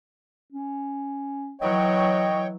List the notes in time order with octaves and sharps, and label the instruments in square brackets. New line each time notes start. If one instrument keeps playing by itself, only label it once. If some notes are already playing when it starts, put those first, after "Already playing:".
[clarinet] C#4
[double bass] E3 F#3 [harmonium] C#5 G5 [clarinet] D#5